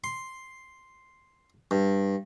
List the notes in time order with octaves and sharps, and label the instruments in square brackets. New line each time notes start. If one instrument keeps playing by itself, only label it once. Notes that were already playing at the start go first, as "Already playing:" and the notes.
[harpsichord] C6
G2